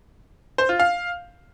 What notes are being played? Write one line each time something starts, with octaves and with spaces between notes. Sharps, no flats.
C5
F4
F5